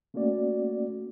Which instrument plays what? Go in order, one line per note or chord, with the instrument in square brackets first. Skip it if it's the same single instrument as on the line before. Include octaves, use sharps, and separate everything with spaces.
[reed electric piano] A3 A#3 C#4 F#4 D5